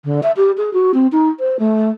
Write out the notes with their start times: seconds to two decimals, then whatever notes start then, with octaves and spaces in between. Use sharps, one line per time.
0.04 D3
0.23 E5
0.37 G4
0.57 G#4
0.73 F#4
0.94 C4
1.12 D#4
1.40 C5
1.59 A3